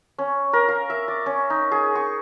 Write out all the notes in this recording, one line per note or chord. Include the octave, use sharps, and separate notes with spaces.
C#4
A#4
F5
E5
D5
C#4
D#4
G#4
C#6